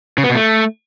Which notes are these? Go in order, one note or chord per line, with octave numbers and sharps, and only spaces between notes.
C#3
B3
B2
A3